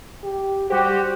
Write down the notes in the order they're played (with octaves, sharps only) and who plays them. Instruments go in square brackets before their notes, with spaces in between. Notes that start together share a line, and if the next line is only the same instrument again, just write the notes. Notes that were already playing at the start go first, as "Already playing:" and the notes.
[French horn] G4
[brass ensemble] G3 F#4 G4 [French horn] C5